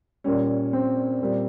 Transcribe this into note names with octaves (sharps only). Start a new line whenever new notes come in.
A#2 G3 C#4
C4
A#2 G3